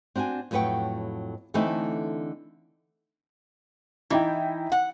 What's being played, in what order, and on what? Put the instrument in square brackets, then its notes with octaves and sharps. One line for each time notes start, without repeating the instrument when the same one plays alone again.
[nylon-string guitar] C4 D4 F#4 G5 G#5
F2 A2 F#3 B4 F#5 G5
D3 E3 A3 C4 D#4 E4
[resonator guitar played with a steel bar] E3 [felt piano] D#4 E4 G5
[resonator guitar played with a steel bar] F#5